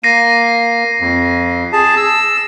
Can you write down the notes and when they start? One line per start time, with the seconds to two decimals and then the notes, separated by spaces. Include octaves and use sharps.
0.04 A#3 A#6 C7 D#7
1.00 F2
1.73 G#4 A5
1.97 E6